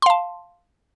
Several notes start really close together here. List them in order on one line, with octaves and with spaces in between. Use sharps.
C6 F5 A5